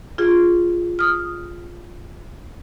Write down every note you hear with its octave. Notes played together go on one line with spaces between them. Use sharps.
F4 G#4
D#6 F6